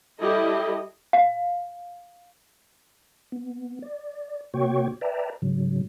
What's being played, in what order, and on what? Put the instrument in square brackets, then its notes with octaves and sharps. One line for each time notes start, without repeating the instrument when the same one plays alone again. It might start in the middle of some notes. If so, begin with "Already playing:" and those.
[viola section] G3 E4 G4 A4 D#5
[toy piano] F5
[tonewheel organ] B3
D5
C3 A#3 F#4 C#5 G5 C#6
B4 D5 E5 G5 A5 A#5
G#2 C#3 F#3